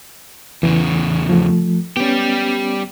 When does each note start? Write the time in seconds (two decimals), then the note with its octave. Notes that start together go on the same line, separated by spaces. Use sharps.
0.63 E2 C#3 E3
1.29 F3 A3
1.97 G3 B3 C#4 G4